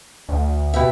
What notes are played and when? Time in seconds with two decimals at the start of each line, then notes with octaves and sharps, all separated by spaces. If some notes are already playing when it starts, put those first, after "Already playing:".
0.29 D2
0.74 B2 G4 E5